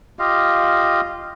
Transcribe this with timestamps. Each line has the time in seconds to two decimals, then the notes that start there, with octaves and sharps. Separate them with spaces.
0.19 F4 G4 D#5 F5